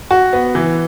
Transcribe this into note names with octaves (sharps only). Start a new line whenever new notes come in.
F#4
B3
E3